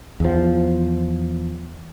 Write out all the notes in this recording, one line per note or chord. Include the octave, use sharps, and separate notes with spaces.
E2 F3